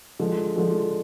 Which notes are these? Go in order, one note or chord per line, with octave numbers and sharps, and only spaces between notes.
D3 F3 G#3
D3 F3 G#3